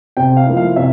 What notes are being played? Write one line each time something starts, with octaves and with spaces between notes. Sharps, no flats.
C3 G5
F5
F3 A#3 E4
F5
C3 E5